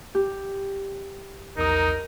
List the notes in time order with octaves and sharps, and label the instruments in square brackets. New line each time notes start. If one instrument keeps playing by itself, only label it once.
[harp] G4
[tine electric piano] A#1 E2 D#6 [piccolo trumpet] D#4 [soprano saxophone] A#4